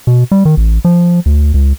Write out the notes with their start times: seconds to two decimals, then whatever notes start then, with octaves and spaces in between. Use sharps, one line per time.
0.07 B2
0.32 G3
0.45 D#3
0.57 A1
0.85 F3
1.26 D2
1.54 C#2